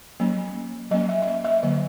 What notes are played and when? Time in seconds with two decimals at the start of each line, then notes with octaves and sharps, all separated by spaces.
0.20 F#3 A#3 C#4
0.91 F#3 A#3 C#4 D#5
1.09 E5
1.22 E5
1.27 D#5
1.44 E5
1.63 D3 F#3 A#3 D#5